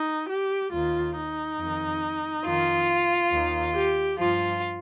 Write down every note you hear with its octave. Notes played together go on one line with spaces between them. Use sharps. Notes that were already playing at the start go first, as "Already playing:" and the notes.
Already playing: D#4
G4
D#2 D#3 F4
D#4
F2 D#3
F2 D#3 F4
D#2 D#3
G4
G2 F3 F4